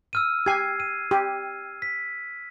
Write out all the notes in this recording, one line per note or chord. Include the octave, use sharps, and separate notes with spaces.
E6 F6 D#7
G4 G#5 G#6 C7
D#7
G4
B6